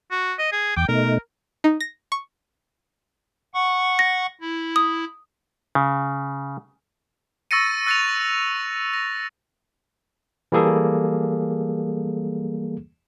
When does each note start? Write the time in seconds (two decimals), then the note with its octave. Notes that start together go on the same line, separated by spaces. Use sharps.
0.12 F#4
0.39 D#5
0.52 G#4
0.77 E2 G5 D6
0.88 B2 A3 D#4 A#4
1.64 D#4
1.80 A#6
2.12 C#6
3.54 F#5 C#6
3.99 A#6
4.41 E4
4.76 D#6
5.75 C#3
7.51 C#6 E6 A6 A#6 C#7 D#7
7.87 E6 F#6 A6 A#6 C#7 F7
8.93 A#6
10.52 E3 G3 A#3 G#4 A4